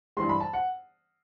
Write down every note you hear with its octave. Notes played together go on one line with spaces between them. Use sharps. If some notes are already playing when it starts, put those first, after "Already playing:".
G2 E3 G3 C6
B5
A5
F#5